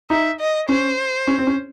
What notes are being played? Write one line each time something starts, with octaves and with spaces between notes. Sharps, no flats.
D#4 E5
D#5
C#4 C5
C#4
C4
C#4